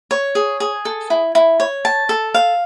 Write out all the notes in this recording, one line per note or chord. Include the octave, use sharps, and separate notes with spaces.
C#5
G#4
G#4
A4
E4
E4
C#5
A5
A4
F5